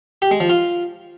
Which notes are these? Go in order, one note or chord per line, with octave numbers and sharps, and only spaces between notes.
G4
G#3
F3
F4